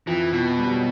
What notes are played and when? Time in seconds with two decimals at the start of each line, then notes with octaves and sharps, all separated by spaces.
0.07 F2 E3 F3
0.33 B2
0.59 G3
0.67 F#3